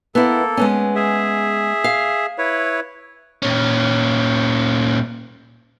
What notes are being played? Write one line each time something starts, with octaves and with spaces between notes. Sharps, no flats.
A#3 B3 E4 A4
G#3 B3 C#4
G#4 E5
F5
E4 B4 C#5
A#2 C#4